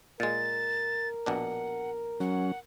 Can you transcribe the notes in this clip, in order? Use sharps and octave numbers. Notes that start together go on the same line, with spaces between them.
A#2 G#3 A#4 A6
A#1 B2 D4 F#5
F#3 C#4 F#5